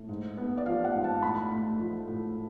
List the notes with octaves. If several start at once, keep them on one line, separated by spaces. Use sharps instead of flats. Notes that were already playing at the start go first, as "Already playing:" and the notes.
Already playing: A2
G#2
B3
D5
F3 F5
F#5
G#2
A5
A2 B5
A3
F3
A2